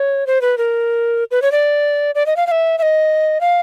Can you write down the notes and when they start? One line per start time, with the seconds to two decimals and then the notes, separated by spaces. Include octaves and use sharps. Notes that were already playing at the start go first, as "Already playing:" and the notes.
Already playing: C#5
0.27 C5
0.42 B4
0.58 A#4
1.31 B4
1.42 C#5
1.52 D5
2.15 D5
2.26 D#5
2.36 F5
2.47 F5
2.51 E5
2.78 E5
2.82 D#5
3.41 F5